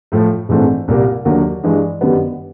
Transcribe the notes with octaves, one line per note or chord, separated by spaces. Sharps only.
A2 F3 A3
A#1 G#2 E3 A3 C4
C2 A#2 G3 A#3
D#2 D3 F#3 A#3
G2 E3 G#3
G1 F#2 D#3 G3 B3